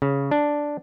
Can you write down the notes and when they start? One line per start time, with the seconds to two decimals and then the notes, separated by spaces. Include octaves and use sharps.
0.02 C#3
0.31 D4